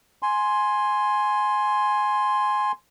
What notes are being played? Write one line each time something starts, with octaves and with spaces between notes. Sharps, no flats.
G#5 C6